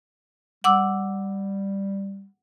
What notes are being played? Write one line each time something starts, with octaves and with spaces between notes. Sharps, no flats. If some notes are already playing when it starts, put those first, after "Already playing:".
G3 F#5 D6 E6